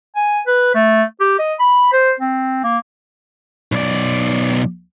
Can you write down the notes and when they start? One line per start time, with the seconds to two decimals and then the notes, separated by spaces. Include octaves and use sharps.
0.16 G#5
0.47 B4
0.75 A3
1.20 G4
1.39 D#5
1.60 B5
1.93 C5
2.20 C4
2.64 A#3
3.72 B1 D5